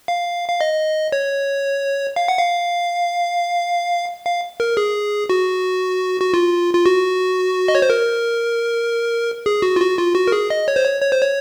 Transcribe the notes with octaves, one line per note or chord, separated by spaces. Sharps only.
F5
F5
D#5
C#5
F5
F#5
F5
F5
A#4
G#4
F#4
F#4
F4
F4
F#4
D#5
C#5
C5
A#4
G#4
F#4
F4
F#4
F4
F#4
A#4
G#4
D#5
C#5
C5
C#5
C#5
C5
C#5